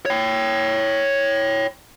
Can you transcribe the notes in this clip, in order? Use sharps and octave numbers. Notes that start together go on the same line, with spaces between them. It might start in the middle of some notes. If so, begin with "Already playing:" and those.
C#5 G5